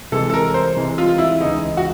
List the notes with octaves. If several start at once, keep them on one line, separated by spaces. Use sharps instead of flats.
C2 C3 E3 G#3 A4
A4
A#4
C5
C2 C3 E3 G#3
F4
E4
D2 C#3 E3 G#3 D#4
F#4